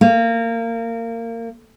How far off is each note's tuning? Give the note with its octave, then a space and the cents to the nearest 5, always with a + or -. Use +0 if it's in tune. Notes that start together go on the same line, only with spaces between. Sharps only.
A#3 -25